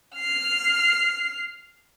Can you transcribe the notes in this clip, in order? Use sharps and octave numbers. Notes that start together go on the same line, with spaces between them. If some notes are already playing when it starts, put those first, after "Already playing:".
F6 C7